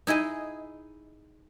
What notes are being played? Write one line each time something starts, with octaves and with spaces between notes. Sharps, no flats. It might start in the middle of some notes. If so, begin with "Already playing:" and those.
D#4 E4 G#4 D#5